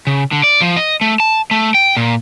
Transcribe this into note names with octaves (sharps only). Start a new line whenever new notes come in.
C#3
D3
D5
F3
D#5
A3
A5
A3
G5
A#2